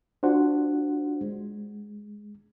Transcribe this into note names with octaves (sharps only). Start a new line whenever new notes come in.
D4 F4 F#4 C5 F#5
G#3